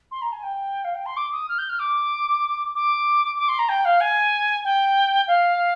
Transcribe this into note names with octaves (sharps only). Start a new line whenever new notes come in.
C6
A#5
G#5
G5
F5
G5
C6
D6
D#6
F6
G6
F6
D6
D6
D6
C6
A#5
G5
F5
G#5
G5
F5